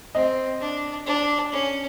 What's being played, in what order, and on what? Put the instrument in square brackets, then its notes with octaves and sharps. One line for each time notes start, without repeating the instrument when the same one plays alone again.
[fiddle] C4 [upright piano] D#5
[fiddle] D4
D4
C#4